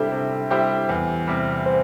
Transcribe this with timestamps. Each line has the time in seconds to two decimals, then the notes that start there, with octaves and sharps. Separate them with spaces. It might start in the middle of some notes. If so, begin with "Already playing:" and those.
Already playing: C3 G3 D4 E4 G4 A4 C5
0.12 C3
0.50 G3 E4 G4 C5
0.89 E2
1.27 C3 G3
1.66 C5